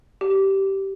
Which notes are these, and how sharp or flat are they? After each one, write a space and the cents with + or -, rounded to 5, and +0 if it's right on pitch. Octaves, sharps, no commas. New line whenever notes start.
G4 -15